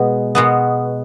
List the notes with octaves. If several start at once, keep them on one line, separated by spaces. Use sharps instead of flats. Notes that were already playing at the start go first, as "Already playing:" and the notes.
Already playing: B2 G#3 B3
B2 G#3 B3